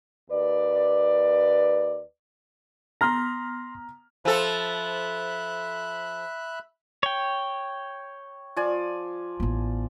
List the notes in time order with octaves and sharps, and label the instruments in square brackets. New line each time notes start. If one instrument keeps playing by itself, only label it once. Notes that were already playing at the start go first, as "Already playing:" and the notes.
[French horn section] D#2 B4 D5
[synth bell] B3 D#6 B6 [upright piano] A#5 F6 [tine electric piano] C6 A#6
[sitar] F3 A4 [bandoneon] E5 B5 F#6
[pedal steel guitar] C#5 G5
[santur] F3 D5 G#5
[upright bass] A1 B3